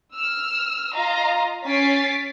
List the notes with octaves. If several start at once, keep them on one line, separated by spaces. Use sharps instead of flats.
E6 F6
F4 D#5 F5 A#5
C#4 G#5 A6 B6 C7 D7